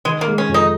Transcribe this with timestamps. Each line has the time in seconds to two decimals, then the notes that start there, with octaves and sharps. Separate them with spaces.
0.05 D#3 G#3
0.21 A#3
0.27 G#3
0.38 C#4
0.49 F2
0.54 D#4